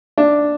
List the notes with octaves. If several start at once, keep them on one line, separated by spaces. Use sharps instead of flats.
D4